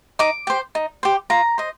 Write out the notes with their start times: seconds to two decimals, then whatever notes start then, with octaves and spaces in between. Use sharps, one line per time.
0.19 D#4 D6
0.47 G4 C5
0.75 D#4
1.03 G4 C5
1.30 F4 A#5
1.58 C5 D#5